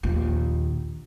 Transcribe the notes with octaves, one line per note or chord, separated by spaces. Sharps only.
A#1 D#2